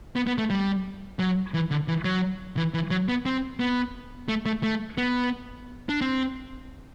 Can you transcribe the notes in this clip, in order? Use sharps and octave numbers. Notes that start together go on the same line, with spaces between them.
B3
B3
A3
G3
F#3
E3
D3
E3
F#3
E3
E3
F#3
B3
C4
B3
A3
A3
A3
B3
D4
C4